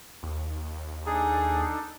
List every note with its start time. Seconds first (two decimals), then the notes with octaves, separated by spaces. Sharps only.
0.23 D#2
1.06 D4 D#4 G#4 A4